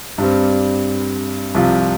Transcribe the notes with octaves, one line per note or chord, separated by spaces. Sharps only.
G2 G3 C4
C2 C3 F3